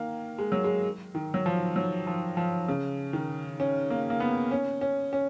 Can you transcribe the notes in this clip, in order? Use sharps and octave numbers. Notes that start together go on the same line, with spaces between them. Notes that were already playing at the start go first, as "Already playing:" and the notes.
Already playing: D#3 A#3
G#3
F#3
G#3
D#3
F#3
F3
F#3
F3
F3
C#3
D#3
C#4
A#3
A#3
B3
C#4
C#4
C#4